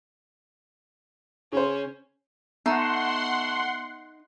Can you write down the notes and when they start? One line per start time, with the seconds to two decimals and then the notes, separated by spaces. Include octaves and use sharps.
1.52 C#3 C#4 C5
2.66 A3 B3 D#4 F#5 A#5 C6